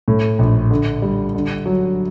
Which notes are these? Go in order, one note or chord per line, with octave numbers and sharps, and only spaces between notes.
A2
A#1
D3
G3
D3
F#3